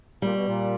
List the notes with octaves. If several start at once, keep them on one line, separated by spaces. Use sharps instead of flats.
A#2 G3
B2
A#2